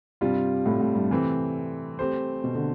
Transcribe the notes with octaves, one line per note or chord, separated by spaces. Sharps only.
G2 C3 G3 C4 F4
A2
A2
G2
C3 E3 A3 C4 G4
A3 C4 G4 C5
B2
D3